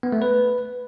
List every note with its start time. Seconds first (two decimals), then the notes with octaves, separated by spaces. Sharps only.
0.03 B3
0.12 A3
0.22 B4